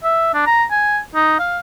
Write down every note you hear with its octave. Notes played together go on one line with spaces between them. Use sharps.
E5
D4
A#5
G#5
D#4
F5